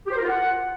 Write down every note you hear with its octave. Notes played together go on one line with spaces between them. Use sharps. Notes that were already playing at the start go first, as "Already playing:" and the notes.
G4
C5
A#4
F4
F#5